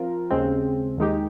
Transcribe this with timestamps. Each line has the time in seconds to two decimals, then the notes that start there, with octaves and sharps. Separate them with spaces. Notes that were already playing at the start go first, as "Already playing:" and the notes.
Already playing: F3 C4 F4 A#4
0.30 D#2 C#3 G#3 C4
0.97 D#2 D#3 G#3 D#4 G4